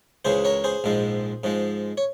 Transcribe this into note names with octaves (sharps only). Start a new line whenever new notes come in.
C#2 C#3 E3 G#4 C5
A#4 C#5
G#4 C5
A#1 G#2 F3 G#3
G#2 F3 G#3
C#5